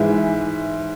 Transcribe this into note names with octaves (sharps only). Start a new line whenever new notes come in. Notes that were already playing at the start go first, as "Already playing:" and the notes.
Already playing: G#2 E3 G#3 E5